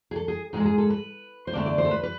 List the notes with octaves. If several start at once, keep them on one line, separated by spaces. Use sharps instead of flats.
G#4
A4
G#4
G#2 G#3 G#4 A4
G#4
A4
B4
C5
E2 D3 A3 D5
D5
C5
A4
B4
B4